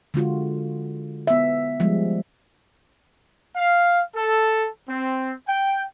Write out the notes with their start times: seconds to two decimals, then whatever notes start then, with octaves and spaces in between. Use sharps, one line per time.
0.14 D3 G#3 F4 F#4
1.27 B3 E5
1.80 F3 G3 G#3
3.56 F5
4.15 A4
4.88 C4
5.47 G5